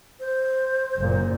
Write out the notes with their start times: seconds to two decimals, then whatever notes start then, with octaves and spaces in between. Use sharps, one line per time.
0.20 C5
0.99 F#1 A#2